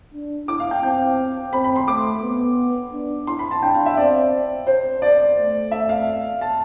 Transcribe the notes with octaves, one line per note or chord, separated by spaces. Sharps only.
D4
E4 D6
F5
G5
C4 G5
C4 B5
B5
C6
A3 D6
B3
D4
E4 C6
B5
A5
D4 G5
F5
E5
C4 D5
C5
D5
A3
E5
F5
A5